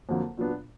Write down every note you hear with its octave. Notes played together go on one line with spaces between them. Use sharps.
F2 D3 F#3 A#3
A#2 F#3 B3 D4